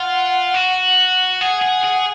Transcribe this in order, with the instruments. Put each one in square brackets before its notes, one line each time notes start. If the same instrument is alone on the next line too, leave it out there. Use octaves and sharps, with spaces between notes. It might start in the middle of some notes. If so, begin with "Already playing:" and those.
Already playing: [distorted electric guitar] F4 [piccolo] F#5
[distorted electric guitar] F#4
[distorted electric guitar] G#4 [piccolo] F#5
[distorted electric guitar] G#4
G#4